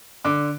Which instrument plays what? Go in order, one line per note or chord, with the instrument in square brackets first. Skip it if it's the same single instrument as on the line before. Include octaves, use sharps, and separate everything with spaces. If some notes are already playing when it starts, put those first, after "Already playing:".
[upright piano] D3 D6